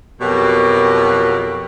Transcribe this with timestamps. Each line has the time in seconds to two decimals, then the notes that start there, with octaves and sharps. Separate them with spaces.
0.21 F2 B2 F#3 F#4 G4 A#4